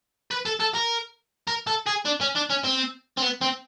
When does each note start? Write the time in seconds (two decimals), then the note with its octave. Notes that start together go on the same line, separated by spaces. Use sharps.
0.31 B4
0.46 A4
0.60 A4
0.75 A#4
1.47 A#4
1.67 A4
1.86 G#4
2.05 D4
2.21 C#4
2.35 D4
2.50 C#4
2.64 C4
3.17 C4
3.22 B3
3.41 C4